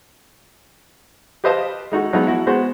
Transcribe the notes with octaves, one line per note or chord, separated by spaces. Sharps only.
G4 B4 C5 D#5 F5 A5
G#3 D#4 F#4 A4
F3 F#3 G#3 B3 D#4
E4 F#4
G#3 B3 F#4 C5